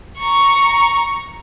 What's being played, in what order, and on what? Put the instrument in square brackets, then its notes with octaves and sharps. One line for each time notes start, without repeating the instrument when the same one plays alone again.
[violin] A#5 C#6